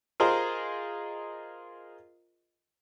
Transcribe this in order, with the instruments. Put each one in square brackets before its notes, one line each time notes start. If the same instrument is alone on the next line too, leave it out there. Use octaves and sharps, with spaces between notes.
[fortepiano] F4 G#4 A#4 C5 D#5